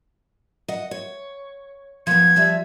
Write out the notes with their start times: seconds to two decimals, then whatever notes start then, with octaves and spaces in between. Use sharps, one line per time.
0.68 D#5 F#5
0.91 C#5
2.07 F3 B3 G#6
2.36 F3 G3 E5